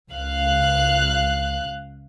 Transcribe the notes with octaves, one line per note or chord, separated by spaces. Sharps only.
C#2 F5 F#6